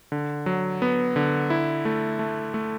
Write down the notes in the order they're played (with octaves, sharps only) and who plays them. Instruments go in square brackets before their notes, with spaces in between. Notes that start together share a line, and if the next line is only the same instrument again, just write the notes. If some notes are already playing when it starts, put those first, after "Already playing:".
[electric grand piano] D3
F#3
B3
D3
E4
A3
A3
A3